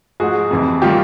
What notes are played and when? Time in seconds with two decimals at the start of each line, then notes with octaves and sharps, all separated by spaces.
0.20 G#2 F3 G#3 F#4 G#4
0.51 F2 C3 E3
0.82 D#3 G3 F4 G4